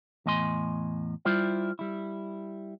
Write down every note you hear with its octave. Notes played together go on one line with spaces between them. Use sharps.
E2 A2 D#5 G#5 C6
G3 E4 F4 C5 D5
G3 E4